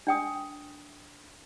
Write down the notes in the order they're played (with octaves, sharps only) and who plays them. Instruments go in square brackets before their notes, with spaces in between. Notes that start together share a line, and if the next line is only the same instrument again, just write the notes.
[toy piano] D4 G5 D#6